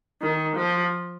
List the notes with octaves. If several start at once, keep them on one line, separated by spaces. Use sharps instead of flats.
D#3
F3